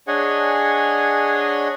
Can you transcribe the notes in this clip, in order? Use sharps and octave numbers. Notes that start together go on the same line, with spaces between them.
D4 G#4 C#5 D#5 F#5 G#5